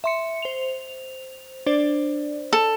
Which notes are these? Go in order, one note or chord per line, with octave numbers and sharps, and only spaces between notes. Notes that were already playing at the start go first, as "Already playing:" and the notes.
E5 C6 C#7
C5 F7
D4 C5 D5
A4